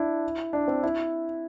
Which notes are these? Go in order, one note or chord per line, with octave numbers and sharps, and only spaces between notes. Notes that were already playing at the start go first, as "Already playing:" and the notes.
Already playing: D4 E4
D4
C4
E4